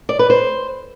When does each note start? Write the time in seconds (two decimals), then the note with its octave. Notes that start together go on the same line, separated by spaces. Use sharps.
0.09 D5
0.19 B4
0.30 C5